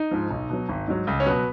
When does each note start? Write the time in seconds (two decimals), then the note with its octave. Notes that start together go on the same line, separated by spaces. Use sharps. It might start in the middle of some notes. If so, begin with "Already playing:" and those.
Already playing: D#4
0.11 G#2 F3
0.31 B1
0.50 B2 F#3
0.69 G#1
0.88 G#2 F#3
1.07 C#2
1.20 C#4
1.26 B2 F#3 B3